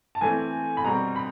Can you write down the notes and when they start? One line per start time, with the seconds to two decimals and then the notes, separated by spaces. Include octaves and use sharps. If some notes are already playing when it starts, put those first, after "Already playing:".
0.15 A5
0.21 E3 A3 C4 G#5
0.77 B5
0.84 B2 G3 C4 A#5
1.16 B5